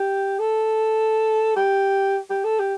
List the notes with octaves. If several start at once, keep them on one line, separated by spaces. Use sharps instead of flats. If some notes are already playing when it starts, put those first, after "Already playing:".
Already playing: G4
A4
G4
G4
A4
G4